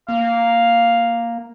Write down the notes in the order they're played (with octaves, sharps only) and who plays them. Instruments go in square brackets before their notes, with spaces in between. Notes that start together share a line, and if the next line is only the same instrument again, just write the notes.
[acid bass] A#3 [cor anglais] F5